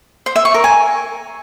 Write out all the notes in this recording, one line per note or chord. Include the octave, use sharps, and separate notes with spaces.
C5
E5
C#6
A#4
G#5